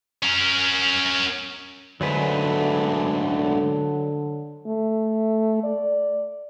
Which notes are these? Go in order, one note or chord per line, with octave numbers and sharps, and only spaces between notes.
C#4 A#4
D2 G#2 D3 F#3 B4 C5
A3
D5